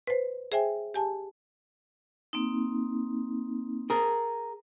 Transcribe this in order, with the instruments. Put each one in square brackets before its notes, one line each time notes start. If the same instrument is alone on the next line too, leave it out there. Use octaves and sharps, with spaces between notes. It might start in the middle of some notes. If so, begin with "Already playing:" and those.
[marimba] B4 C5
G#4 C5 E5 G5 G#5
G4 G#5 A5
[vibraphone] A#3 C4 D#4
[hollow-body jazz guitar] G#4 A#4